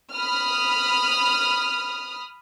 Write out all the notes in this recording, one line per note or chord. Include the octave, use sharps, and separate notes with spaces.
B5 D#6 F6